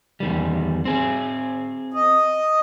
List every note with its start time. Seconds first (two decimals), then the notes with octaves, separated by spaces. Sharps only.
0.20 E2 D#3 G3
0.85 C4 G#4
1.94 D#5